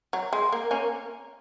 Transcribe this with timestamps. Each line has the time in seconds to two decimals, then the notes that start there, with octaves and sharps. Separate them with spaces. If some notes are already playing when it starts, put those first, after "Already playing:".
0.13 F#3
0.33 G#3
0.53 A#3
0.71 A#3 C#4